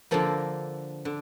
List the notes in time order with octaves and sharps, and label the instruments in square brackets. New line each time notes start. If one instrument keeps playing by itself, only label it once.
[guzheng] D3 F3 A#3 A4
D3